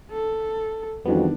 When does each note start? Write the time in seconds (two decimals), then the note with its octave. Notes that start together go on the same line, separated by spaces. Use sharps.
0.11 A4
1.05 F2 D#3 E3 G3 B3 D4 F#4